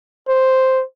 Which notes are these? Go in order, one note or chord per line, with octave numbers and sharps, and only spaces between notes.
C5